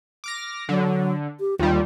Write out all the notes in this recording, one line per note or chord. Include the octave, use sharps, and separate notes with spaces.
D6 F6 A#6
D3 F#3
G4
D#2 G3 F4